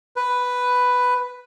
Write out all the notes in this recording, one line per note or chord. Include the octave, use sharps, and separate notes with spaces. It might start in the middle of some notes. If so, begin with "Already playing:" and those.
B4